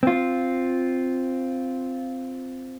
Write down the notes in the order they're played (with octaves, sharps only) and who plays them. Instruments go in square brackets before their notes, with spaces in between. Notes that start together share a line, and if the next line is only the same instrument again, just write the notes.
[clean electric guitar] C4 F4